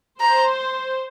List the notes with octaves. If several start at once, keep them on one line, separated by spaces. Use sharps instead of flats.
C5 A#5